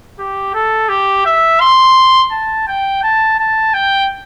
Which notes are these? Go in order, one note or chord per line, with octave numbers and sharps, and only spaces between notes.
G4
A4
G4
E5
C6
A5
G5
A5
A5
G5